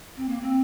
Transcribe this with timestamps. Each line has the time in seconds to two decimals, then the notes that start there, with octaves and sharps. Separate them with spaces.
0.17 C4
0.29 A#3
0.42 C4